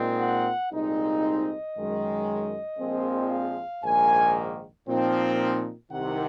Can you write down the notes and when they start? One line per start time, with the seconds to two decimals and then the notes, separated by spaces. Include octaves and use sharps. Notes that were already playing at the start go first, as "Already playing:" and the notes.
Already playing: A#2 G#3 C4 D#4
0.19 F#5
0.71 C2 A#2 G#3 C4 D#4
1.22 D#5
1.75 F#2 D#3 G#3
2.79 A#1 A#2 F3 G#3 C4
3.32 F5
3.83 A#1 G#2 D#3 A#3 G#5
4.87 A#2 F3 C4 D#4
5.91 C2 C3 D#3 F#5